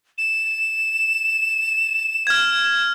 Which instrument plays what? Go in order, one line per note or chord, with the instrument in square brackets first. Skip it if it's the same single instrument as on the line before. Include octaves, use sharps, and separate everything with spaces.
[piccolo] E7
[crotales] F6 G#6